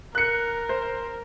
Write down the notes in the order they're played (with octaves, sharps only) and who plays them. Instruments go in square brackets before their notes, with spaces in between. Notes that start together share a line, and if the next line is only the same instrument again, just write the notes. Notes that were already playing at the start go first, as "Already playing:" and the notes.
[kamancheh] A#4 [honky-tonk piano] F#6 C#7
[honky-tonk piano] C5